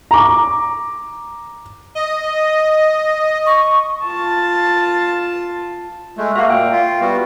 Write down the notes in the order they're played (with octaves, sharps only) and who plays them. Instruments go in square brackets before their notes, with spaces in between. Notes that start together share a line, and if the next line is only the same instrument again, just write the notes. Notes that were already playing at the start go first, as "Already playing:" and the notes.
[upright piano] A#5 D6
[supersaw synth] D#5
[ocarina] C#6
[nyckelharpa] F4 A5
[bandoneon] G#3 A3
[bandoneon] A#3 F#4 [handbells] E5 F5
[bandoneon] A#2 [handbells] G5
[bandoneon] F4
G3 B3 F#4